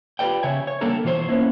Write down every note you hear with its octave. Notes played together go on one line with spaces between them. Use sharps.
F4 G4 A4 B4 D5 G5
C#3 C#5 E5 G#5
C#5
D3 G3 A#3 D4 A4 A#4
B2 E3 F#3 C#4 C5 C#5
A#3 B3 C#4 E4